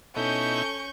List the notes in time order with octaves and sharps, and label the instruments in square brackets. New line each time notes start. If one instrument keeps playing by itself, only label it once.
[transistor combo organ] B2 D#4 E4 [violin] C#4 C#6 [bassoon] A4 [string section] G6